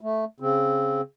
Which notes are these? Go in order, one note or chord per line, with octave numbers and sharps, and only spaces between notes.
A3
C#3 C4